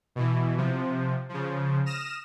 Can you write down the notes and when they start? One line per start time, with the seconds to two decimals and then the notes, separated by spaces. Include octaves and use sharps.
0.15 B2 E3
0.57 C3 F3
1.29 C#3 F3
1.86 D#6 F6 A#6 E7